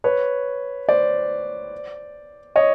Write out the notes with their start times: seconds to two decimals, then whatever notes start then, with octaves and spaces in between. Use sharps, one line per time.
0.04 B4 C#5
0.89 C5 D5
2.56 C#5 D#5